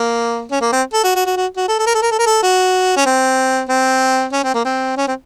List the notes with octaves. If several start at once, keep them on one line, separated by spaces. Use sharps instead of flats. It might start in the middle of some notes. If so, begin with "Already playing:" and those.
Already playing: A#3
C#4
A#3
C4
A4
F#4
F#4
F#4
F#4
F#4
A4
A4
A#4
A4
A#4
A4
A#4
A4
F#4
C#4
C4
C4
C#4
C4
A#3
C4
C#4
C4